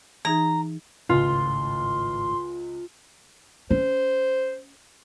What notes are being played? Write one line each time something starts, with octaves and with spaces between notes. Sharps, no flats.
E3 D#4 G#4 A#5
G#1 C#2 A2 F4 C6
C#4 C5